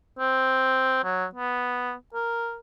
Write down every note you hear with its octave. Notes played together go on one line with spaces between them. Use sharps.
C4
F#3
B3
A#4